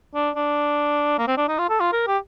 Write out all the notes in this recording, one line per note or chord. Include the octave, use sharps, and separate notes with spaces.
D4
D4
A#3
C4
D4
D#4
F4
A4
F4
A#4
G4